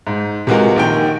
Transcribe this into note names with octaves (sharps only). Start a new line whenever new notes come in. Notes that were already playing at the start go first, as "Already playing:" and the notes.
G#2
C3 E3 G#3 F4 F#4 A#4
A#1 D#3 G5